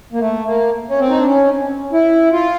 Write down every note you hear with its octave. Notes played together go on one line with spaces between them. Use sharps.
A#3
A3
A#3
C#4
C4
D#4
D4
C#4
E4
F4